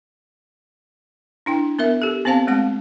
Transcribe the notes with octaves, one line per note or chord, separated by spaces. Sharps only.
D4 E4 G5
B3 A#4 E5
G4 A4
B3 C4 C5 F5 A5
G#3 A3 C4 F#5